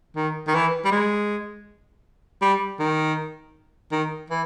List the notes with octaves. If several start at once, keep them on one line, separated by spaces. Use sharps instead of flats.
D#3
D#3
E3
G3
G#3
G3
D#3
D#3
E3